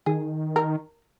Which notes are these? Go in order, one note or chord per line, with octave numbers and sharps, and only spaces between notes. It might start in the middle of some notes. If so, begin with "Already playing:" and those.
D#3 G#4
A#4